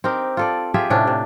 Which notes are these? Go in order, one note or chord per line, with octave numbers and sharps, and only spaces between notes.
C4 D#4 G4 A#4
F4 A4 D5
F4 G4 G#4 E5
A2 C3 C#4 D4
C3